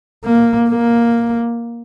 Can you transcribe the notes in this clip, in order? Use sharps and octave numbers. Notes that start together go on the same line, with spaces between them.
A#3
A#3